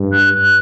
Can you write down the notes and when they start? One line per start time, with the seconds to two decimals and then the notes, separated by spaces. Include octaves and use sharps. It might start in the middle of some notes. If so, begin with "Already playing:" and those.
Already playing: G2
0.12 F#6
0.33 F#6